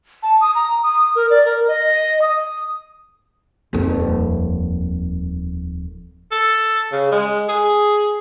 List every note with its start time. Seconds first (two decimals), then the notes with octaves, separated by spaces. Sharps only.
0.23 A5
0.41 D#6
0.55 A#5
0.83 D#6
1.16 A#4
1.30 D5
1.45 A#4
1.68 D#5
2.22 D#6
3.73 D#1 F2
6.32 A4
6.92 C#3
7.11 G#3
7.48 G#4